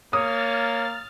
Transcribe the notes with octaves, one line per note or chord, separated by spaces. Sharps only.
A#3 C#5 D#6 F6 A6